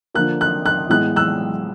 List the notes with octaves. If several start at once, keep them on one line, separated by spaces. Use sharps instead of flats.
D3 F3 A#3 F#6
F#6
F#6
A2 E3 G#3 B3 F#6
E6 F#6